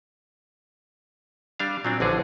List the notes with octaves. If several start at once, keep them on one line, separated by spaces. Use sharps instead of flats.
G3 D4 F5
A#2 F#3 C4 D4
A1 D3 F3 G#4